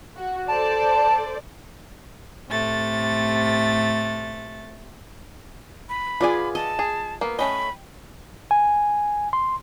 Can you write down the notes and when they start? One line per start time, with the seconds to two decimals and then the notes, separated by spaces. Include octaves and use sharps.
0.16 F#4
0.48 A4 C5 D5 A5
2.48 A2 C3 A3 A6
5.89 B5
6.21 B3 F4 G#4 D5 G#5
6.55 D#5 A5
6.79 G#4
7.21 A#3 B3
7.39 A3 C#4 D#5 G5 B5
8.51 G#5
9.33 C6